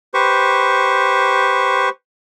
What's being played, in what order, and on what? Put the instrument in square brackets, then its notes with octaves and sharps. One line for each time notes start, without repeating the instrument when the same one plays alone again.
[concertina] G4 B4 C5 C#6